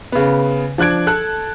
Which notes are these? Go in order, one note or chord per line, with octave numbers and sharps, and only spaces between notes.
C#3 B3
F3 D4 F#6 G#6 D7
A4 A5 F#6